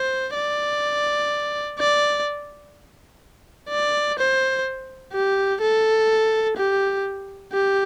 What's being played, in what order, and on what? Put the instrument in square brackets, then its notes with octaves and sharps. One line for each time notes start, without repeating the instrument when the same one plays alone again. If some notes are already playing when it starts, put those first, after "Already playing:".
Already playing: [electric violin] C5
D5
D5
D5
C5
G4
A4
G4
G4